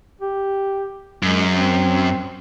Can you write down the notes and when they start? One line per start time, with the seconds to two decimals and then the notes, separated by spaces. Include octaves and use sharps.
0.22 G4
1.23 F#2 G#3
1.54 C4